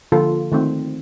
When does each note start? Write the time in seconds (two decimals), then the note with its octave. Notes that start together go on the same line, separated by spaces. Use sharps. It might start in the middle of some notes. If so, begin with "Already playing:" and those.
0.12 D3 F3 A#3 F4 A4
0.52 D#3 A3 C4